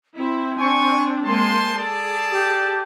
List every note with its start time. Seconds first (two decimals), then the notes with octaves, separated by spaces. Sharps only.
0.17 C4 E4
0.59 D4 G#5 C#6
1.24 G#3 A#3 C5 G#5 A5 C6
1.77 G#4 A4 D5 A5
2.32 G4